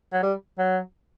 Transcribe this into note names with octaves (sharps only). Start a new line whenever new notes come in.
F#3
G3
F#3